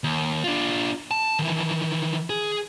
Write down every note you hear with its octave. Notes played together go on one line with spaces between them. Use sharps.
D#2
D4 F4
A5
D#3 E3
G#4